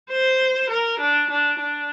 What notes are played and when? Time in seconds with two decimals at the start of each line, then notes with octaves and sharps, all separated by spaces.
0.11 C5
0.70 A#4
1.00 D4
1.30 D4
1.60 D4